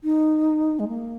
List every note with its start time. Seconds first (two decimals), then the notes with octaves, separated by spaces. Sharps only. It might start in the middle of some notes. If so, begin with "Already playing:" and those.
0.04 D#4
0.79 G#3
0.88 A#3